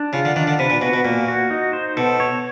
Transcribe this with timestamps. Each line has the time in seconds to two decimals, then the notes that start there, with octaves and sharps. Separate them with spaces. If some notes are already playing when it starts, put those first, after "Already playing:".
Already playing: D4
0.13 C#3 F4
0.25 D3
0.36 D#3 D4
0.47 D3
0.59 C3 B4
0.70 A#2
0.81 B2 F#4
0.93 B2
1.05 A#2 A#3
1.28 F#4
1.51 D#4
1.73 C5
1.97 B2 A4
2.20 C#5